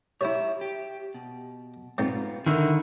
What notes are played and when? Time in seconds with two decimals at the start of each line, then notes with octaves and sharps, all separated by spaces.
0.21 E4 G4 C#5 E5
0.61 G4
1.14 B2
1.98 G#2 B3 C4 F4
2.46 D3 D#3 E4 A#4